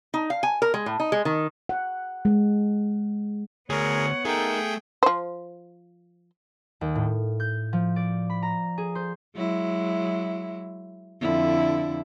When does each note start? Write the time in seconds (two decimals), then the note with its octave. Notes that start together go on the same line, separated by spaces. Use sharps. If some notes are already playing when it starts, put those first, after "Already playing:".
0.14 D#4
0.30 F5
0.43 G#5
0.62 A#4
0.74 G#3
0.86 A2
1.00 D#4
1.12 G#3
1.25 D#3
1.69 F#5
2.25 G#3
3.70 D2 B3 G#4 A#4 C#5 F#5
4.25 A3 D#4 G#4 A#4 G5
5.03 F3 C5
6.81 D#2
6.95 A2
7.40 G6
7.73 F3
7.96 D5
8.30 B5
8.43 A#5
8.78 G#4
8.95 C5
9.36 F#3 G#3 E4
11.20 F2 D3 E4